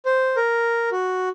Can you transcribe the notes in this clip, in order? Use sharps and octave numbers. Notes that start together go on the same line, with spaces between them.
C5
A#4
F#4